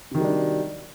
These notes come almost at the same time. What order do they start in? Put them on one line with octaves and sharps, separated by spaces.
C3 D#3 F#3 G3 D4